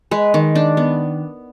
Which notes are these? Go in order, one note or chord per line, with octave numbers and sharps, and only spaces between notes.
G#3 B4
D#3
D4
B3